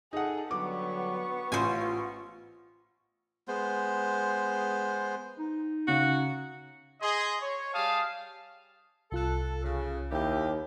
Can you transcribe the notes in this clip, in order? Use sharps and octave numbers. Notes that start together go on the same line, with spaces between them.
D#4 G#4 A4 F#5
D3 F#3 G3 B3 C#6 D6
A1 F4 C5 G#5
G#3 B3 C5
D#4
C#3 F#4
G#4 D#5 C6
C#5
G3 G4 G#4 F5 A5 D#6
C2 F4 A4 F#6
C#3
D#2 E4 G4